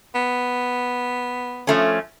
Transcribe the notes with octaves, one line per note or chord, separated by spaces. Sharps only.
B3
F3 A3 C#4